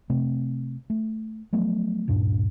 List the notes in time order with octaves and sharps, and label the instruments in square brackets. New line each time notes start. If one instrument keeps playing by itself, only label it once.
[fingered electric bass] C3 A3 C4
A3
F3 F#3 A3 B3
D1 G2 A#2 D4